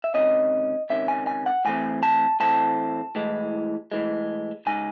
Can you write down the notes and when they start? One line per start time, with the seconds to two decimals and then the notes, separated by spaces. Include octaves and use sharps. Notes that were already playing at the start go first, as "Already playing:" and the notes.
0.04 E5
0.14 C#2 C3 D#3 C#4 D#5
0.90 C#2 C3 D#3 C#4 E5
1.08 G#5
1.27 G#5
1.46 F#5
1.65 A2 E3 A3 C4 G#5
2.03 A5
2.40 A2 E3 A3 C4 A5
3.15 A2 E3 G#3
3.92 A2 E3 G#3
4.66 C#3 G#3 D#4 G#5